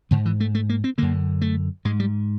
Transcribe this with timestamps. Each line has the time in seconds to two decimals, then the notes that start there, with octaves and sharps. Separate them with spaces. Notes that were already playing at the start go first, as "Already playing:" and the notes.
0.11 G#2 D3
0.26 E3
0.40 A3
0.55 A3
0.69 A#3
0.84 C4
0.98 F#2 D3 A#3
1.42 A3
1.85 G#2 G#3
2.00 G3